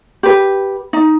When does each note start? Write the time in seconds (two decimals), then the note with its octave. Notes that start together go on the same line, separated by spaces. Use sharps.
0.23 G4 B4
0.93 D#4